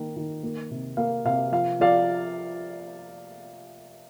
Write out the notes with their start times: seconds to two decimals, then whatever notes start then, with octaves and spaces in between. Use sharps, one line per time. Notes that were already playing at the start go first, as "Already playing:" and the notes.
Already playing: D#3 A#3
0.16 D#3
0.43 A#3
0.71 C3
0.97 A#3 F5
1.25 C3 F5
1.52 F3 F5
1.80 F3 D5 F5